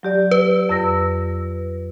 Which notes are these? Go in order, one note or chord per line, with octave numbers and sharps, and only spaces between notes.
F#3 G4 D5
B4
F2 E6 A#6